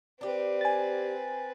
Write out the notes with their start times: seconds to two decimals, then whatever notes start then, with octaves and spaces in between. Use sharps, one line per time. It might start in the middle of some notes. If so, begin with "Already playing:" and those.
0.21 C4 D4 G4 B4
0.61 G#5 A6